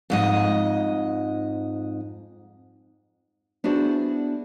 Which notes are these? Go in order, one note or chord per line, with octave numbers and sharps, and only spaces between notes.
F2 G#2 D#5
B3 D4 E4 F#4 G#4 C5